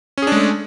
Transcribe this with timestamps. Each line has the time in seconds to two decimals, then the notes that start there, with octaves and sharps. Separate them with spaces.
0.18 C#4
0.22 G#4
0.27 D4
0.32 G#3
0.37 A3